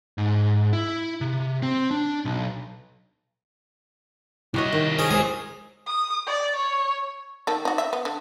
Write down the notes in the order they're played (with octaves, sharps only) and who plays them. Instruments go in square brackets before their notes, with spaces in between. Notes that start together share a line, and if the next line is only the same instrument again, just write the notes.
[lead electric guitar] G#2
E4
C3
C4
D4
B1
[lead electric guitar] C2 D#5 [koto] G3 F#4 C#5 [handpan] E4
[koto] D#3
[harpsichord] C#4 G#4 [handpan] C5
[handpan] G#3 C5 [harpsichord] G#4 [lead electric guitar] A#4 G#5
[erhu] D#6
D5
C#5
[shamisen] D#3 A4
D#4 F#4
E5
B3
D3